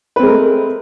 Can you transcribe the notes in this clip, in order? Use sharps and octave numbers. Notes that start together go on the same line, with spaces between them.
G#3 A3 C4 A#4 B4